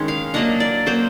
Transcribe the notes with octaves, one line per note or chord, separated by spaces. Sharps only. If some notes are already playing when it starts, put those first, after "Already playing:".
Already playing: D#3 G#3 C#4
F5
F#3 A#3 D4 D#5
D5
F#3 A#3 C#4 C5